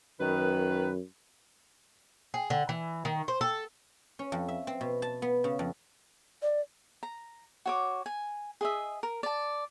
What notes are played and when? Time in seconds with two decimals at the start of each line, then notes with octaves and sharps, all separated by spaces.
0.20 F#2 D#3 B4
2.34 G#4
2.50 D3
2.69 E3
3.05 D#3
3.28 C5
3.41 A4
4.19 C#4
4.32 F2
4.48 E5
4.67 C4
4.81 B2
5.02 A5
5.22 B3
5.44 C#3
5.59 F2
6.42 D5
7.03 A#5
7.66 F#4 C#5 D6
8.06 G#5
8.61 G#4 D#5 E5
9.03 A#4
9.23 D5 A5